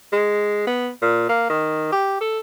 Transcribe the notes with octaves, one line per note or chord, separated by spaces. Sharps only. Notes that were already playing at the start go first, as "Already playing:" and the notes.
G#3
B3
A#2
A#3
D#3
G4
A4